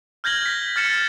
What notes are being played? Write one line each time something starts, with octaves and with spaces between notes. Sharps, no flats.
F6 G6 G#6 A#6 F#7 G7
B6
F6 A6 C#7 E7